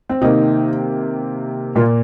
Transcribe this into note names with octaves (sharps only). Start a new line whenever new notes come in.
C4
C3 D#3 A#3 D#4
A#2 A#3 F4